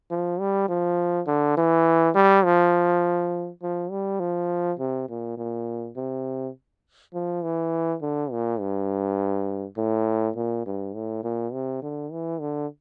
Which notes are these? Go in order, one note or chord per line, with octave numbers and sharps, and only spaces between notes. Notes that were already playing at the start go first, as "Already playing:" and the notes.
F3
G3
F3
D3
E3
G3
F3
F3
G3
F3
C3
A#2
A#2
C3
F3
E3
D3
A#2
G2
A2
A#2
G2
A2
A#2
C3
D3
E3
D3